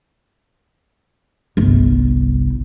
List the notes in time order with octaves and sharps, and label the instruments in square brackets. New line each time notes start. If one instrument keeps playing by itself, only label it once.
[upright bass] G1 C2